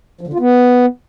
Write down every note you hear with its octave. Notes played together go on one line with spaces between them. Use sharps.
F3
D3
F4
B3